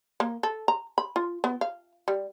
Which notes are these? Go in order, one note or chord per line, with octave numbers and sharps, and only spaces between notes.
A#3
A4
A#5
B5
F4
B3
F5
G3